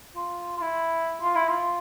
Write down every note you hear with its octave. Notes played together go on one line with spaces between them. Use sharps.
F4
F4
E4
F4
E4
F4